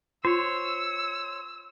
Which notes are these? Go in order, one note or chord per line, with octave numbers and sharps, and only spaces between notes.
F4 C5 C#5 E6